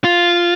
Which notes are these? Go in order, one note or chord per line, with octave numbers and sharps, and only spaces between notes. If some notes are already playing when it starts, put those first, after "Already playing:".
F4